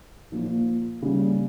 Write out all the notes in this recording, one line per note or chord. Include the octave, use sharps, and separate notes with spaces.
A#2 F3 A#3
C#3 G3 A#3